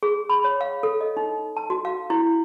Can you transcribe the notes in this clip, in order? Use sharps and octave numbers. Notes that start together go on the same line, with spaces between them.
G#4
B5
C#5
F5
A4
D#5
D#4
A5
F#4
F5
E4